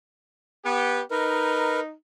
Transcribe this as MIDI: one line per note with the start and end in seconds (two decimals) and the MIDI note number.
0.64 1.01 59
0.64 1.01 67
1.11 1.90 63
1.11 1.80 70
1.11 1.80 71